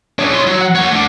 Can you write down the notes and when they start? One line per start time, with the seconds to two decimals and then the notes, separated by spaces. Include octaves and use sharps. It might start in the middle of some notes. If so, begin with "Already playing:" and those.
0.19 D4 G#4 C#5
0.33 E4 C6
0.47 F#3
0.61 F#5
0.75 A#3 C#5
0.91 A3 D4